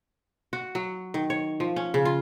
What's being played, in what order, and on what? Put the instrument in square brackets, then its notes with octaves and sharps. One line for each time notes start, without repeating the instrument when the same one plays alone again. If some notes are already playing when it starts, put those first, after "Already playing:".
[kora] F#4
F#3
D#3
C#5
F3
C#4
C#3
F4